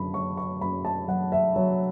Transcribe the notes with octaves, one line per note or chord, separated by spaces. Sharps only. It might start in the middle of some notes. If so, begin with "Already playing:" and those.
Already playing: F#2 D3 A5 B5
F#3 C#6
C#6
F#2 B5
A5
F#3 F#5
E5
F#3